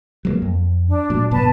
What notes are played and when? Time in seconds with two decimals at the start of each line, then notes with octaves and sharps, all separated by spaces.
0.25 F#3 G3 A#3
0.42 F2
0.88 D4
1.10 A#2 F#3
1.31 G1 B2 B3 B4 A5